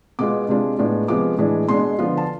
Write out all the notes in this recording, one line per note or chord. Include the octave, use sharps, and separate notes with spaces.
B2 G#3 B3 F4 D6
C3 G#3 D4 F4
A2 G#3 B3 D4 F4
C3 F3 G#3 B3 D6
A2 E3 G#3 D4
B2 G#3 D4 C6
D3 F3 B3 F4
A5